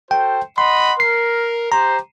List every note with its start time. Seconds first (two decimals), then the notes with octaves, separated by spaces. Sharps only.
0.11 F#4 A4 C5 G5
0.58 D#5 F#5 B5 C6
1.00 A#4 C7
1.72 G4 C5 A#5